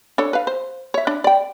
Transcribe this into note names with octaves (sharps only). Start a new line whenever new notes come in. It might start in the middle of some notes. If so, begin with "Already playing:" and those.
D4 A4 C#5
B4 F5
C5
C#5 E5
D4
D5 G5